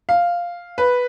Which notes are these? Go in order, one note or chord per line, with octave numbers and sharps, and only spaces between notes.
F5
B4